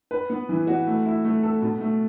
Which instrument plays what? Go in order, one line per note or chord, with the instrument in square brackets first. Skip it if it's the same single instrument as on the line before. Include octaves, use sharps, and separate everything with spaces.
[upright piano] B4
B3
E3
F#4
A3
E4
A3
A4
B2
A3